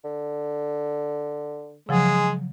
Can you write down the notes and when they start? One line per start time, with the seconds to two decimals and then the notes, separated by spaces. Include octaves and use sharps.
0.05 D3
1.89 C#3 F3 F#3 G#3